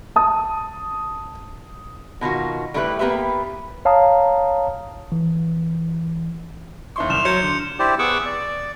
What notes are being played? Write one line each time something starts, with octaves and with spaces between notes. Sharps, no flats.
A5 D#6
B2 D#3 F4 F#4
G3 A3 E4 G4 A#4 B4
A#3 B3 G4 B4 E5
C#5 F5 A5 A#5 D#6
E3
D#2 E4 C6 C#6
C2 F6 E7 F7
F#3 G6 C#7
D3
E4 G4 C5 D5
B3 G#4 F#5 C#6 D6 E6
D5